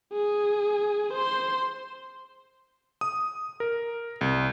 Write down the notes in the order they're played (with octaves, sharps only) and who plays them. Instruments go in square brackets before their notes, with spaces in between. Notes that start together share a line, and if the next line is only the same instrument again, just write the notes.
[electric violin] G#4
C5 C6
[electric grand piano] D#6
A#4
C2